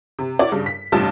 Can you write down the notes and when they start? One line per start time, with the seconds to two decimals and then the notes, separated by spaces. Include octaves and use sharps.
0.19 C3
0.39 E4 F#4 C#5 D5
0.52 G2 C#3
0.66 B6
0.92 A1 G2 C3 F4 A5